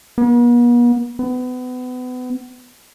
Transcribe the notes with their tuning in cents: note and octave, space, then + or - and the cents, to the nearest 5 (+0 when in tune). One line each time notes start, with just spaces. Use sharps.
B3 -45
B3 +30